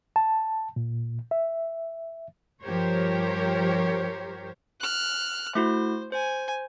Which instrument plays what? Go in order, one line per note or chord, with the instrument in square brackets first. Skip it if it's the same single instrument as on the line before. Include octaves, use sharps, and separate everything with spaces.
[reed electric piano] A5
A#2
E5
[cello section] G2 F3 G4 A#4 C5 C#5
[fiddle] F6 F#6
[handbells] A3 E4 F#4 [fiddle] C5
[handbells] C5 [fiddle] G#5